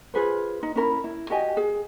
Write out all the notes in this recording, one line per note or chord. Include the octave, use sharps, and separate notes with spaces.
F4 G#4 B4 C5
D#4
C#4 E4 A#4 B5
E4
F#4 G4 D#5 G#5
G#4